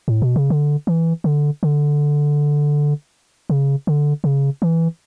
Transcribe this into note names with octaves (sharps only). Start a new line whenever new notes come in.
A2
B2
C#3
D3
E3
D3
D3
C#3
D3
C#3
E3